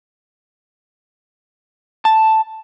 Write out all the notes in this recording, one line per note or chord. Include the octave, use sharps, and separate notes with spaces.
A5